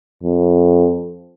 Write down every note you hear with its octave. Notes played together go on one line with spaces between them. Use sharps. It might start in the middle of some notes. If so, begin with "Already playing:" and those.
F2